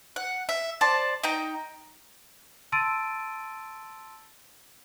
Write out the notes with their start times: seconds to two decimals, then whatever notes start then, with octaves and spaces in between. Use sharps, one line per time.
0.16 F#5
0.49 E5
0.81 C5 D5 A5
1.24 D#4 G5 A#5
2.72 A5 C6 E6 A6 D7 D#7